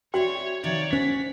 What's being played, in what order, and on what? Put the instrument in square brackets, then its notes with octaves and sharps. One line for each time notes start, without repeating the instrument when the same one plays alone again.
[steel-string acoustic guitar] C4 D5 E5 [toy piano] F#4 G5 C6 [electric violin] C#5
[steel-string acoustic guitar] C3 D#3 F3 [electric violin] C#5 D5
[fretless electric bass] C#4 [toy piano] C5 [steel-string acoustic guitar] F#5 [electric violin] B6